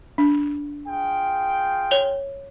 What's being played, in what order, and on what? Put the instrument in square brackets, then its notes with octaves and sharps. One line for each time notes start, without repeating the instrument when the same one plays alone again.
[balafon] D4
[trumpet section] F4 G#4 G5
[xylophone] C#5 F7 G7